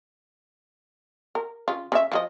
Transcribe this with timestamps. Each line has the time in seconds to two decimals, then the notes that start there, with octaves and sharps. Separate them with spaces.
1.35 A#4
1.68 C#3 F4
1.92 C#3 C#4 E5
2.12 F3 G#4 D#5